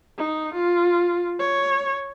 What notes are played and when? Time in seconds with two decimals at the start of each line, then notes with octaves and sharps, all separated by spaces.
0.18 D#4
0.54 F4
1.39 C#5